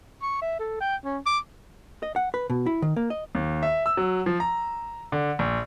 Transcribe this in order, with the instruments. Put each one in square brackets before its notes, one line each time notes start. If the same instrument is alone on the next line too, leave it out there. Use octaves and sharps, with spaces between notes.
[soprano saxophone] C#6
E5
A4
G5
C#4
D6
[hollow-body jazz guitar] D#5
F#5
B4
B2
E4
D#3
A#3
D#5
[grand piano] D#2
E5
E6
F#3
F3
A#5
D3
A#1